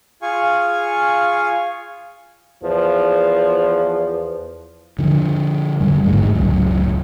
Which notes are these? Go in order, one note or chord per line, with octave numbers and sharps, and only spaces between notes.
F4 G#4 F5 G#5 C#6
E2 F3
D3 F3
F2 D3 G3
A1 D2 G#2 G#3
D1 C#2 F#2